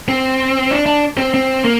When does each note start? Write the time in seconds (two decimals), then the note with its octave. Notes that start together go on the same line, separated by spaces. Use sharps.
0.08 C4
0.71 D4
0.86 D4
1.17 C4
1.34 C4
1.64 A#3